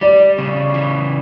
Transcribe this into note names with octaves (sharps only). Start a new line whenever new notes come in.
G3 D5
C#3
E3